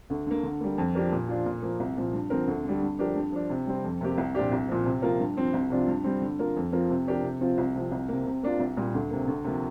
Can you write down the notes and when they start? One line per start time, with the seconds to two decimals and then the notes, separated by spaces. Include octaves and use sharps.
0.10 D2
0.27 D3 A#3
0.43 D3
0.61 G3 A#3
0.78 F2
0.95 F3 D4 G4 A#4
1.12 A#2
1.29 F3 D4 F4
1.46 A#2
1.62 F3 A#3
1.80 C2
1.97 A#2 F3
2.13 G2
2.30 D3 F3 C4 A#4
2.48 D2
2.65 D3 G3
2.81 G2
2.99 F3 D4 G4 A#4
3.16 G2
3.32 F3 D4
3.50 C3
3.67 G3 C4
3.84 F2
4.01 C3 A#3 G4
4.18 C2
4.35 A#2 F3 D4 G4
4.52 C2
4.68 A#2 F3
4.86 C3
5.02 F3 A#3 F4 A#4
5.20 G2
5.37 F3 C4
5.54 C2
5.70 C3 F3 D4 F4
5.87 G2
6.04 G3 C4
6.22 D3
6.39 A#3 F4 A#4
6.56 F2
6.72 F3 C4 F4 A#4
6.90 C3
7.07 F3 D4 G4 A#4
7.23 C3
7.41 F3 C4 F4
7.58 C2
7.75 C3 F3
7.92 C2
8.09 C3 A#3
8.26 C3
8.43 A#3 D4 F4
8.60 C2
8.76 A#2 G3
8.94 D2
9.11 C3 A#3
9.27 D2
9.44 C3 F3 A#3